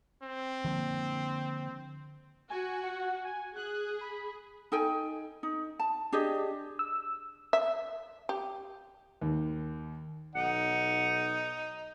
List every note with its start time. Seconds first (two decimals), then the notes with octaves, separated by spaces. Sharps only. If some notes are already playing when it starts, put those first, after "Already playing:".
0.23 C4
0.64 D3 F3 A#3
2.50 F#4 G#5
2.84 F#5
3.25 G#5
3.56 G#4 F#6
4.01 B5
4.72 D#4 A4 G5 G#5
5.43 D#4
5.79 A5
6.12 D4 G4 G#4 D#5
6.79 E6
7.53 E5
8.29 G4
9.21 D#2
10.35 B1 D#4 F#5